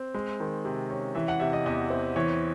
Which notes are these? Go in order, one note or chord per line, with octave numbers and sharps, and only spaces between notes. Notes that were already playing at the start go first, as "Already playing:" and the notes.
Already playing: C4
G#3
D#3
C3
C#4
E3 E5
F#5
C3 E5
D#5
E2 D#5
C4
E3 C#5